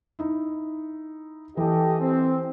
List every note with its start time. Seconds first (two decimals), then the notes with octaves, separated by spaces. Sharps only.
0.19 D#4 E4
1.57 E3 G4 A4 D#5
2.00 C4